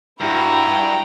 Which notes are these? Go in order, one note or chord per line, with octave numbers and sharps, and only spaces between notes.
G2 E4 F#4 G5 A#5